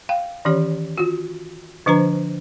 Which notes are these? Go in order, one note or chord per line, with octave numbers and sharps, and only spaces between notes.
F5 G5
D#3 E3 C#4 G4 C#5
F4 F#4
D3 F3 D4 B4 C5 A#5